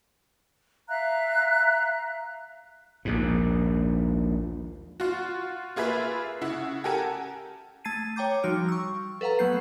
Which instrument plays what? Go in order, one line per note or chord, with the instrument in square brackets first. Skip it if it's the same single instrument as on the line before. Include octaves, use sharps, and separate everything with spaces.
[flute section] E5 F5 A#5 F#6
[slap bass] A#1 D#2 G#2
[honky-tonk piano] F4 F#4
A#3 F4 G#4 B4 E5
C#3 E4 F#5
G4 A4 A#4 F#5 G#5 A5
[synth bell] A3 A5 G#6 A6 C7 D#7
C#5 G5 A#5 D6 G6
F3 G3 D#4 F#4 F6 D7
C#6 E6
A4 B4 F5 F#5 A#5
F#3 A3 B3 G6 C7